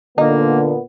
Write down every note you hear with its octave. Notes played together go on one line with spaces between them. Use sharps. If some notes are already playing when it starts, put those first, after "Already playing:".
A#2 D3 A#3 B3 D#4